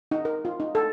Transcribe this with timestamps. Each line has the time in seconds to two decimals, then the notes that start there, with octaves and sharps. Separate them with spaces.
0.11 D#4
0.25 A#4
0.45 F4
0.60 D#4
0.75 A4